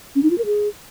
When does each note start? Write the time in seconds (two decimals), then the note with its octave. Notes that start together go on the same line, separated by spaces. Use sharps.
0.16 C#4
0.23 D#4
0.31 F4
0.38 A#4
0.46 G#4